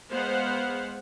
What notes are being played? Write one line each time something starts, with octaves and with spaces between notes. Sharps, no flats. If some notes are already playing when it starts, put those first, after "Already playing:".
G#3 B3 C5 F5 F#5